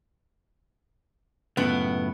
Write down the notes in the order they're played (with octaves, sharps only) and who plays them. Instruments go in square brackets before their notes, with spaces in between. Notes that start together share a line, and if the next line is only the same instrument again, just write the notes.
[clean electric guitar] C#2 F#2 A2 [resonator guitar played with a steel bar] B3